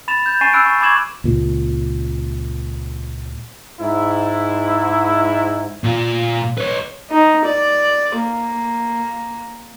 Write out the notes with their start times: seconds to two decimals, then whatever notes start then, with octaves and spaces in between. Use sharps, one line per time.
0.08 B5 A6 E7 F7
0.26 G6
0.41 G#5 C#6 A6 C7 D#7 E7
0.53 B5 E6 F#6 D7
0.66 C#6
0.81 B5 C#6 D6 G#6 E7 F#7
1.24 C#2 A#2
3.79 G#2 E4
5.84 A#2 F4
6.58 B4 C#5
7.10 D#4
7.45 D5
8.16 A#3